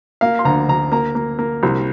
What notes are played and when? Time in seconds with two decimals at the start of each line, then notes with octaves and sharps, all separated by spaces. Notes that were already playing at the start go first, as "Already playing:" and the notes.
0.21 A#3 F5
0.39 C6
0.45 D2 A#5
0.68 D2 A#5
0.92 A#3 A#5
1.15 A#3
1.39 A#3
1.63 C2